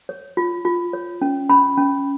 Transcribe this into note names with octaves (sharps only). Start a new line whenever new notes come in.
C#5
F4
F4
C#5
C#4
C#4 B5
C#4